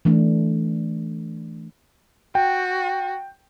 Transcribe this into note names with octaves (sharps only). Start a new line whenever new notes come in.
E3 A3 D4
F#4 G5